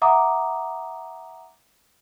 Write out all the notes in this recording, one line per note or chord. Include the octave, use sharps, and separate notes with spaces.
E5 F#5 A#5 D6 D#6